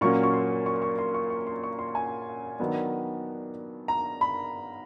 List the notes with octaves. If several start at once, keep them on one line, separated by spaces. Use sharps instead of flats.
A#2 F#3 A#3 C#4 C#6
C#6
C6
C#6
C#6
C6
C#6
C#6
C6
C#6
C6
G#5
D#3 F#3 B3 D4
A#5
B5